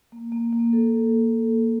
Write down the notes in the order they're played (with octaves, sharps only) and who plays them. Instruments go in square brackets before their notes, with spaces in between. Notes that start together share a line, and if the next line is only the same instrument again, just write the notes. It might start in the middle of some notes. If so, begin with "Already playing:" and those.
[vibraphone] A#3
A#3
A#3
A4